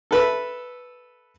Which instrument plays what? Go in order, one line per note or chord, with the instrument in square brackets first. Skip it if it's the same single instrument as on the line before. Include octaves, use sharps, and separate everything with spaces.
[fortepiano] A4 B4 E5